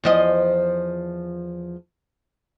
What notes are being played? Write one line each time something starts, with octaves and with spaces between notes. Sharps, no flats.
E2 F3 D#5